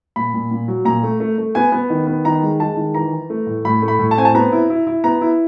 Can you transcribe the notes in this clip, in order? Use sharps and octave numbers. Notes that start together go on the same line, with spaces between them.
A#2 B5
A#2
A#2
F#3
A#2 A#5
A3
A3
A3
B3 G#5
B3
D#3
B3
D#3 A#5
G#3
G#3 A5
D#3
E3 A#5
E3
A3
A2
A2 B5
A3
B5
A2
A5
C4 G#5
A5
B3 A#5
E4
E4
E4
B3 A#5
E4